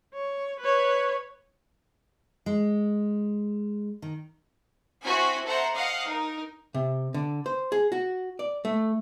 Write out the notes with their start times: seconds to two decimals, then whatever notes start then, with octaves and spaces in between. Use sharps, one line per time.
0.14 C#5
0.60 B4 C#5
2.46 G#3
4.02 D#3
5.04 C4 E4 F#4 C5 G#5 B6
5.46 A4 C5 E5 F#5 A#5
5.74 D#5 F5 F#5
6.06 D#4 A#4
6.74 C3
7.14 D3
7.46 C5
7.72 G#4
7.92 F#4
8.39 D5
8.65 A3